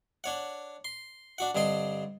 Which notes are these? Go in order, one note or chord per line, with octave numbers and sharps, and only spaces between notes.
D4 C#5 F#5
C6
D4 F#4 F#5
G2 D3 C4 D#5 C6